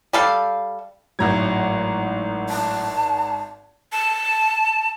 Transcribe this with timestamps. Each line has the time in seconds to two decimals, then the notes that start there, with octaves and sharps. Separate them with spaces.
0.13 G3 A4 F5
1.19 G#1 A2 F#3 A#5 G#6
2.50 A5
3.92 A5